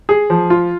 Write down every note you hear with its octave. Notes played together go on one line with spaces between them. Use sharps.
G#4
F3
F4